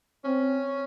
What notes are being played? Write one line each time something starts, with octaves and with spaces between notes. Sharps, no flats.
C4 C#4